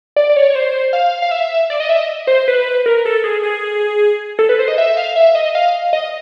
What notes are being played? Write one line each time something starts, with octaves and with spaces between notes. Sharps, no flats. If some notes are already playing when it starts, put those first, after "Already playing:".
D5
D5
C#5
C#5
C5
F5
F5
E5
D5
D#5
E5
D#5
C5
B4
A#4
A4
G#4
G#4
A4
B4
C5
D#5
E5
F5
E5
D#5
F5
D#5